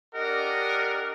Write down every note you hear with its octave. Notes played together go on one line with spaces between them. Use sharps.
D4 G4 A#4 D#5 F#5